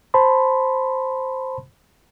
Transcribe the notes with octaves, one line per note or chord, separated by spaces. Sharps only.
C5 A5 B5 C6